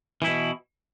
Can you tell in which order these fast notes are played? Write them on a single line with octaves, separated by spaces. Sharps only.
E3 E4 B2